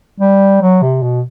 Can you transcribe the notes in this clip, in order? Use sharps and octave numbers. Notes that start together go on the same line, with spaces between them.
G3
F#3
C3
B2